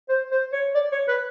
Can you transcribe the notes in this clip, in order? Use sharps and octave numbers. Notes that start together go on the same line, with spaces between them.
C5
C5
C#5
D5
C#5
B4